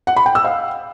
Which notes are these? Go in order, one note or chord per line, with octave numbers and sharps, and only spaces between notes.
F#5
B5
G5
E6
F5